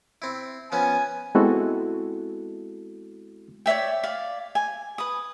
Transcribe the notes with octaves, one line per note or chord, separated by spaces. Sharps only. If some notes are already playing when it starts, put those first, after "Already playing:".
C4 E4
F3 B3 C#4 G#5
G#3 B3 C4 E4 F#4 A4
C#5 D5 E5 G5
D5 F5
G#5
B4 D#6